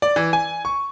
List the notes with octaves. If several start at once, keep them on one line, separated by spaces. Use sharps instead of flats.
D5
E3
G#5
C#6